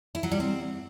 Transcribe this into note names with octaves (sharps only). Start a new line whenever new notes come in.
E4
F#3
G3
C4